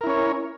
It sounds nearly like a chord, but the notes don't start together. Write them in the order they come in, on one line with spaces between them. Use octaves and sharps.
A#4 E4 C#4 C#5